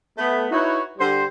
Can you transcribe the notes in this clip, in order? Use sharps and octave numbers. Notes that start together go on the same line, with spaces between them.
A3 B3
D#4 E4 F#4 B4 C#5
D3 G3 C5